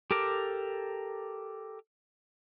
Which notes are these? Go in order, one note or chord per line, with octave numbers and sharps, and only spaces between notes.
G4 A4 A#4 D6